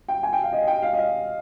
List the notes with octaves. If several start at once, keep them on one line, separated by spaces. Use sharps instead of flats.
G5
G#5
G5
F5
D#5
G5
F5
D#5
F5